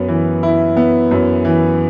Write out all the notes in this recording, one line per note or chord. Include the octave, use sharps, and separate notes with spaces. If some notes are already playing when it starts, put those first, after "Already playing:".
Already playing: F#2 B3
E3
E4
B3
F#2
E3